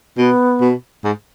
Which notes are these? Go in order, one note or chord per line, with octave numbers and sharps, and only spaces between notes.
B2 B3
B2
G#2